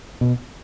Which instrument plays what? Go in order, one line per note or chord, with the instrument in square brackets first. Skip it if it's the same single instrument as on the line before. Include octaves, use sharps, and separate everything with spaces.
[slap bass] B2